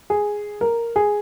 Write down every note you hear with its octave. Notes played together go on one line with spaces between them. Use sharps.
G#4
A#4
G#4